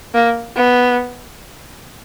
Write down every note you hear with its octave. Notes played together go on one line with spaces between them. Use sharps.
A#3
B3